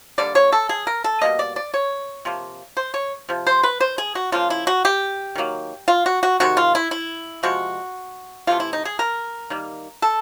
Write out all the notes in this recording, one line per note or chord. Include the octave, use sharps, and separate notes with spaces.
D3 G3 A#3 D5
C#5
A4
G#4
A#4
A4
B2 G3 A#3 D#5
D5
D5
C#5
C3 F3 A#3
C5
C#5
C3 F3
C5
B4
C5
G#4
F#4
C#3 F3 A#3 F4
E4
F#4
G4
D#3 F#3 A#3
F4
F#4
F#4
C3 D#3 G#3 F#4
F4
E4
E4
C3 F3 G#3 F#4
C3 E3 A3 F4
E4
D#4
G#4
A#4
D#3 G3 A#3
A4